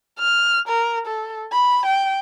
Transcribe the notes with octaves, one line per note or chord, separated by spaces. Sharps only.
F6
A#4
A4
B5
G5